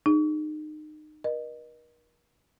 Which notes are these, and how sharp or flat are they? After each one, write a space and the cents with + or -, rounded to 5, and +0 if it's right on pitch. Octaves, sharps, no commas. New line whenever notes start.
D#4 -30 G#4 +0
A#4 +45 D#5 -25